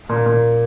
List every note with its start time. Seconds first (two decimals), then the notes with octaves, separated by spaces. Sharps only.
0.09 A#2
0.26 A#2